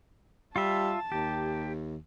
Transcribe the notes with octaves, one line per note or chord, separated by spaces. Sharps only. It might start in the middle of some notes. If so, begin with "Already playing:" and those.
G3 F4 E5 A5
D#2 G4